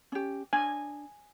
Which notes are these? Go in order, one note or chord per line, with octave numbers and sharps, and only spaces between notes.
C#4 G4
D4 G#5